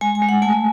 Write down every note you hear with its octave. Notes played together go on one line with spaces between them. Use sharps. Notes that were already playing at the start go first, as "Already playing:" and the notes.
G#3 G#5
G#5
G#3
F#5
A3 G#5